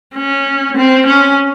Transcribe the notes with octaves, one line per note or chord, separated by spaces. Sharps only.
C#4
C4
C#4